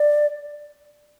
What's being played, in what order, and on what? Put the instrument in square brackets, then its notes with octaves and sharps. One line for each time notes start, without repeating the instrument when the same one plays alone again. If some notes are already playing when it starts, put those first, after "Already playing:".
Already playing: [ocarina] D5